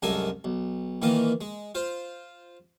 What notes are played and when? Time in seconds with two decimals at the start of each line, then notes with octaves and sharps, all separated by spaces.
0.02 C2 F#2 G#3 A4 A#4 G#5
0.44 B1
1.02 A#2 D#3 E3 A#3 D#5 F5
1.41 G#3
1.75 F4 C5